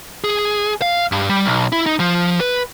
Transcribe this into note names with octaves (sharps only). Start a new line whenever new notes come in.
G#4
F5
G2
G3
B1
E4
D#4
F3
B4